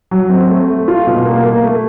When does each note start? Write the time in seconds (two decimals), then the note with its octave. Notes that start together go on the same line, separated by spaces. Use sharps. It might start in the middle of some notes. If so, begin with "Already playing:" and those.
0.11 F#3
0.30 C4
0.49 A3
0.68 A3
0.88 F4
1.07 B2
1.25 A#3
1.44 A#3
1.63 A3